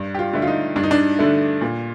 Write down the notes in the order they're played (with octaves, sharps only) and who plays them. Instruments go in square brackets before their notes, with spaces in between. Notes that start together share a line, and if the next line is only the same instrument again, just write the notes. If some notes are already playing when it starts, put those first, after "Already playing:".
Already playing: [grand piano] G2
G4
F4
D3 A3
F4
D#4
G2 D4
D#4
D4
D3 A3
A#2